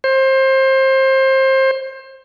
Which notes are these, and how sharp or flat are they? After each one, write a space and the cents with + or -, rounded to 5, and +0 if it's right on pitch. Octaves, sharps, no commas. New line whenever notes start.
C5 +25